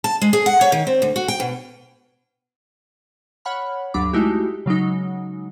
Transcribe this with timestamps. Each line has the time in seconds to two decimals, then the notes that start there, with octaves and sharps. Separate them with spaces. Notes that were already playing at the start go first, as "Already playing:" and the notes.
0.04 A5
0.21 G#3
0.33 G#4
0.46 F#5
0.61 C#5
0.72 D#3
0.87 C4
1.02 D2
1.16 F#4
1.28 G5
1.40 B2
3.45 C#5 F#5 B5 F6
3.94 D2 G2 F#3 D4 B5 D6
4.13 G#3 A3 D#4 E4 F#4 G4
4.66 C#3 F#3 G#3 D#4